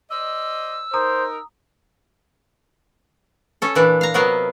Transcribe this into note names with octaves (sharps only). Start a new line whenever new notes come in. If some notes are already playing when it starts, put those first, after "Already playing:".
C5 D5 D#5 E6
D#4 A#4 C5 A#5 D#6
C#4 A4
A#2 E3 D4
F5 A#5
C3 F#3 B3 A#4 D#5 F5